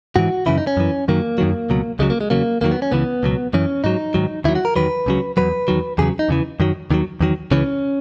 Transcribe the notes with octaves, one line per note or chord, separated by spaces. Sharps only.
G#2 E3 F#4
F#2 C#3 E3 E4
D#4
C#4
F#2 E3
F#2 D#3 F#3 A#3
F#2 D#3 F#3
C#2 B2 F#3
C#2 C#3 F#3 G#3
A#3
G#3
E2 C#3 F#3 A#3
E2 D#3 F#3 A#3
B3
C#4
C#2 C#3 E3 B3
C#2 B2 F#3
F#2 E3 C#4
G#2 F#3 D#4
G#2 D#3 F#3
D#2 D#3 F#3 E4
F#4
A#4
E2 D#3 F#3 B4
C#2 C#3 F#3
E2 B2 F#3 B4
E2 D#3 F#3
E2 C#3 F#3 G#4
D#4
E2 C#3 E3
F#2 D#3 F#3
D#2 D#3 F#3
E2 D#3 F#3
C#2 C#3 E3 C#4